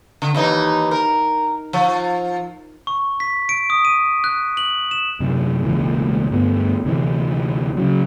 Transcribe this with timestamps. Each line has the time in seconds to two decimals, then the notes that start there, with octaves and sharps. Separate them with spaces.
0.22 D3
0.35 D#2 E3 D#4
0.91 A#4
1.73 F3
2.87 C#6
3.20 B6
3.49 D7
3.70 D#6
3.85 D#7
4.24 F#6
4.57 F#7
4.91 E7
5.20 F#2 C3
5.63 E1 C#2 A#2 E3
6.30 D2 G2 B3
6.84 D2 C3 E3
7.77 C#3 F#3